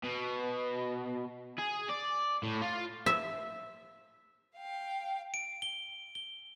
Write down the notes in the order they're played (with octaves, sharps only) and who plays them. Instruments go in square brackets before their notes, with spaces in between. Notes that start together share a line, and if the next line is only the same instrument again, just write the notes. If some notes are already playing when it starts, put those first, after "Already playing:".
[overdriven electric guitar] B2
G#4
D5
A2
F4
[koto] E5
[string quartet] F5 G5
[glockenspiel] D7
G7
G7